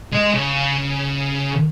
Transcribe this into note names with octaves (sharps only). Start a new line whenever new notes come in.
G#3 D#5
C#3